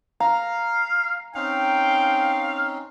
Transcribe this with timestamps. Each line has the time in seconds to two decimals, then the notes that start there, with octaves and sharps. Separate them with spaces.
0.20 F5 A#5
1.35 C4 C#4 D#4 F5 G5